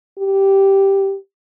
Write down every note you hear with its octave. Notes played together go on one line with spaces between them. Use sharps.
G4